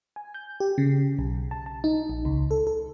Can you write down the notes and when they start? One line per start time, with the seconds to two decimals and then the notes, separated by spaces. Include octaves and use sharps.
0.16 G#5
0.34 G6
0.60 G4
0.78 C#3
1.19 B1
1.51 A5
1.66 A5
1.84 D#4
2.09 A#1
2.25 C#2
2.51 A4
2.67 A4